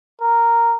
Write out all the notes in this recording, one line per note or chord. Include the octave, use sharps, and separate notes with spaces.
A#4